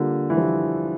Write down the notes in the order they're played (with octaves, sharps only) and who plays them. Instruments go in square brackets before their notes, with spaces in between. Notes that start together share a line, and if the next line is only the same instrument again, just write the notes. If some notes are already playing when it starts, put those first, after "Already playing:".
Already playing: [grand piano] D3 [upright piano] G3 A#3 F4
[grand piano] E3
[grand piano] F3 [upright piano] G3